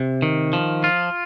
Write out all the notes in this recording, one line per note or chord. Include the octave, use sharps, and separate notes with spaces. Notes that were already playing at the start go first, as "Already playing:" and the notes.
Already playing: C3
D#3
F3
F4